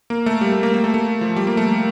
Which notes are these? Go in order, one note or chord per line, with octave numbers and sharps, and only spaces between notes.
A#3
A3
G3
A3
A#3
A#3
A3
A3
F3
G3
A#3
A3